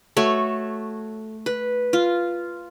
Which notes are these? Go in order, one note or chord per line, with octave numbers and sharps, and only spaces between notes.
A3 F#4 A4 C#5
B4
F4